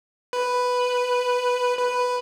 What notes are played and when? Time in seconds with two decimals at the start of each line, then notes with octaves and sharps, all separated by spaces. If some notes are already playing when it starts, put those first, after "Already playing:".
0.33 B4
1.79 B4